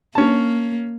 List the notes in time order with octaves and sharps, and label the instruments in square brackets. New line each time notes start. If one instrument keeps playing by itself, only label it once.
[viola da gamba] A#3 [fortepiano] C#4 A5